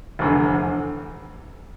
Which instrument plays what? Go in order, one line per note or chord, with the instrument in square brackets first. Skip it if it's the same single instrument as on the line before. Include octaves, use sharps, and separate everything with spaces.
[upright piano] F1 E2 D3